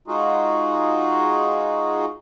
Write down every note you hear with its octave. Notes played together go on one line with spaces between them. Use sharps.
G#3 D#4 F4 F#4 G#4